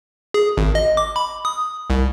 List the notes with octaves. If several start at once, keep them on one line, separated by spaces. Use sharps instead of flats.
G#4
G#1
D#5
D6
B5
D#6
C2